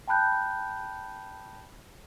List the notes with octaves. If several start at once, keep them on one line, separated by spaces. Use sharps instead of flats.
G5 A5 B5 F#6 G6